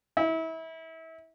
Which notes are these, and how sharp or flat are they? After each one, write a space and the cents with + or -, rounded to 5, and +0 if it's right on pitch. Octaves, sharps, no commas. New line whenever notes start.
E4 -30